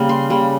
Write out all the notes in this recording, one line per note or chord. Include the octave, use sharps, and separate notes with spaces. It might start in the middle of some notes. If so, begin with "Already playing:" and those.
Already playing: C#3 G3 A#3
C6
C#3 G3 A#3